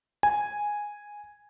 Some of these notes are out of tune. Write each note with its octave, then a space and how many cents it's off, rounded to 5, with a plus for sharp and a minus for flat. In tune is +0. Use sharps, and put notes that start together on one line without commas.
G#5 -5